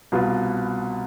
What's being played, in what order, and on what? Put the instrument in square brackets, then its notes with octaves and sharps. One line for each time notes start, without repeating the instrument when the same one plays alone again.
[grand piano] C2 B2 B3 F4